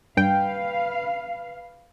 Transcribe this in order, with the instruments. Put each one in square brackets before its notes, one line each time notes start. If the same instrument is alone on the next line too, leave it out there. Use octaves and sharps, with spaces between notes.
[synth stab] G2 G5 [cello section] B4 F5